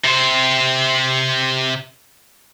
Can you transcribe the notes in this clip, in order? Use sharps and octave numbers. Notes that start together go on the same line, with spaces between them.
C3 C5